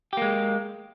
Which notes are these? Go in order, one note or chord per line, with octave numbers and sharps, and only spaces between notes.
G#3 A#3 G4